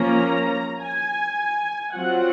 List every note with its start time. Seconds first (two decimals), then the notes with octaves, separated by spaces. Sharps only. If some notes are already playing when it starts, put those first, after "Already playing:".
Already playing: F3 A#3 C#4 F4 A#5
0.80 G#5
1.94 F#3 C4 F4 F#5